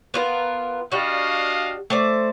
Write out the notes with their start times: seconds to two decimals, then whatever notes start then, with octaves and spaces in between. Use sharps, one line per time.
0.14 B3 F4 A#4
0.92 G3 D4 F#4 D#5 F5
1.90 A3 C5 D5